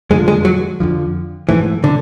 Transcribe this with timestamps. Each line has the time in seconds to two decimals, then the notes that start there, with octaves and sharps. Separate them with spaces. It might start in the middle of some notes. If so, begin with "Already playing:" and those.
0.10 F2 D3 F3 G#3
0.28 G#3
0.45 F#3
0.80 F2 D3 F3
1.49 G#2 E3 F3 A3
1.84 D3